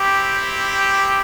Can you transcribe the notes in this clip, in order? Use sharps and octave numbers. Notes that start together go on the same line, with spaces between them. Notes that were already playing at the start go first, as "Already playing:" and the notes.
Already playing: C4 E4 G4